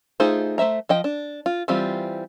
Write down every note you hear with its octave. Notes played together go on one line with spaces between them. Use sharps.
A3 D#4 F4 G#4 C5
A3 C5 E5 A#5
F3 D#5 G5
D4
F4
E3 G3 C4 F4 G4